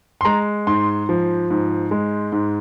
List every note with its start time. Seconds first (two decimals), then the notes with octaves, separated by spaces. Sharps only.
0.21 C6
0.25 G#3 A#5
0.67 G#2 C6
1.09 F3
1.50 G#2
1.91 G#3
2.32 G#2